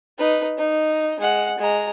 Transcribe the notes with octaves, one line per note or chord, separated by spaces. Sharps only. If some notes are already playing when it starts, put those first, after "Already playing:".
D#4 B4
D#4
G#3 F#5
G#3 A#5